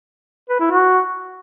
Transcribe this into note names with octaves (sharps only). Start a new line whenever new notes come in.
B4
E4
F#4